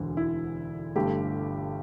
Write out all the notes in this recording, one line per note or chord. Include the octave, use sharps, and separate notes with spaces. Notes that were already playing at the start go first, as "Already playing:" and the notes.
Already playing: E1 D2 D3
E4
G1 G2 D3 A3 G4